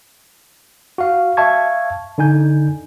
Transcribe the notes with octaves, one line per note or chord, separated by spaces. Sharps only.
F#4 F5
E5 F5 A5 C#6 G#6
D3 D#4 G#5 G6